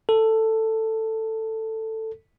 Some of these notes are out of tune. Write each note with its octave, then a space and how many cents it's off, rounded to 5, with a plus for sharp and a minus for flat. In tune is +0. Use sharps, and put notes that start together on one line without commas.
A4 +10